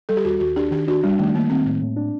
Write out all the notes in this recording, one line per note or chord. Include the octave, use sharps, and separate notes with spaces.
G3 A4
G4
D#2 F#4
D#2 F#4
D4 G4
D#3 G4
D4 F#4
G3 D4
D#3 A3
D#3 A#3
D#3 C4
A2
A2
D4